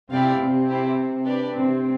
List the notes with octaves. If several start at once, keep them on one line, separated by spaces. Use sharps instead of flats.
C3 C4 E4 G4 D5 F5
C3 C4
E4 G4 C5
D4 G4 B4 D5
C3 C4